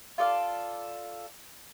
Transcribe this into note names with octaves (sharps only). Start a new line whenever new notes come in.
F4 A4 D5 F5